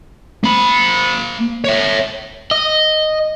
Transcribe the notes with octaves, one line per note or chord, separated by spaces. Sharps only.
A#3 B5
C#5 E5
D#5